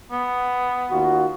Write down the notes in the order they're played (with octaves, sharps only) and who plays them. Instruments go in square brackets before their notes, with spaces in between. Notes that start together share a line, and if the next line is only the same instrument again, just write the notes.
[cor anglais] B3
[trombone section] D#2 F4 F#4